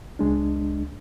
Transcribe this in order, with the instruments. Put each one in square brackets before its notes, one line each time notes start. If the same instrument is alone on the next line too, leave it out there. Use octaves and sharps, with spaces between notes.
[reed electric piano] C#2 G#3 D4